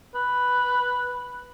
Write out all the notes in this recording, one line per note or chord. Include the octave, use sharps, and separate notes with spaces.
B4